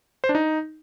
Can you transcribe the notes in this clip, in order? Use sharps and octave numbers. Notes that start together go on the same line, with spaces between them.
C5
D4
D#4